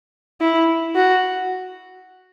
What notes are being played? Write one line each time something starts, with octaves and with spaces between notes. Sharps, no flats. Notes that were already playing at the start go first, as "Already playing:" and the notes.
E4
F#4